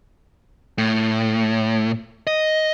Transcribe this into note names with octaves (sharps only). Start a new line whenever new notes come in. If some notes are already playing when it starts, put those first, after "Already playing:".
A2
D#5